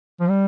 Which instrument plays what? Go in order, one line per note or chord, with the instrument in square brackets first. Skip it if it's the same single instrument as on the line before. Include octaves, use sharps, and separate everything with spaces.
[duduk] F3
G3